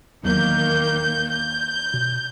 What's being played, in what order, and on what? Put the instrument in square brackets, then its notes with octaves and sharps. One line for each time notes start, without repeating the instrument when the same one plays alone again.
[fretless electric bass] D#1 E2 F#3 [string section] D#3 A#3 G6
[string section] G6
[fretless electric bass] B2